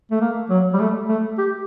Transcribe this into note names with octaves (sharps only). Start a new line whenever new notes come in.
A3
A#3
F#3
G3
A3
A3
G4